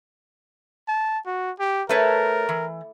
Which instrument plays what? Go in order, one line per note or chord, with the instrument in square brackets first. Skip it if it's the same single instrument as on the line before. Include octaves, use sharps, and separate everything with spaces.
[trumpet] A5
F#4
G4
[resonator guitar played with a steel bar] A3 B4 C#5 [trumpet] A#4
[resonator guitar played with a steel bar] E3